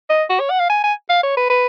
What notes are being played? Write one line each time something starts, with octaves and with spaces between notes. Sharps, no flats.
D#5
F#4
C#5
F#5
F5
G#5
G#5
F5
C#5
B4
B4